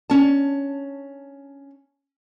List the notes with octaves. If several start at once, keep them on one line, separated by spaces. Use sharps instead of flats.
C#4 A5